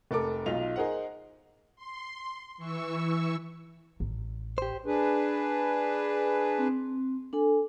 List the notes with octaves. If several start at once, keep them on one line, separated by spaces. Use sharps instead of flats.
F1 A4 A#4 D6
B1 D#4 F4 F7
D#4 G#4 A#4 C5 F#5
C6
E3 C#6 E6
A1
G4 C5
D4 G#4 B4
C4
D4 A4 G#5